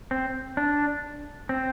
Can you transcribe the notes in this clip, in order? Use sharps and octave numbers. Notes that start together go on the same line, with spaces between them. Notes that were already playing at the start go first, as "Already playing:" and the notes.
C4
D4
C4